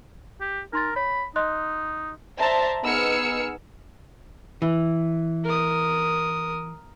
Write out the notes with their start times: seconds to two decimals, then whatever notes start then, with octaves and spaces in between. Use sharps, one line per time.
0.41 G4
0.73 D#4 A#4 C6 A6
0.96 C#5 B5
1.36 D#4 D#5 C6 F#6
2.37 C5 D5 E5 A5 A#5 C6
2.83 B3 D#4 G#4 E6 F6 C#7
4.62 E3
5.45 A#4 D#6